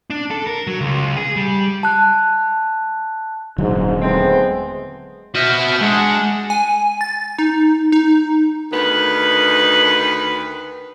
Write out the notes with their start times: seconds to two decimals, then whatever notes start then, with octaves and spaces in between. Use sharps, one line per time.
0.10 D4
0.31 A4
0.47 A#4
0.67 F#3
0.81 C#2
1.17 G#4
1.36 G3
1.83 A5 F#6
3.58 D#1 G#2 D3 F#3
4.01 G#3 A3 B3 C4
5.35 F#4 C5 D#5 E5 F6
5.81 G#3 D4 F#5
6.50 G#5
7.01 A6
7.38 D#4
7.92 D#4
8.71 D2 D#3 B4